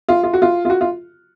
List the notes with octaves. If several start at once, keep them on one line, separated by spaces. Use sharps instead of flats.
F4
F4
F#4
F4
F4
F#4
F4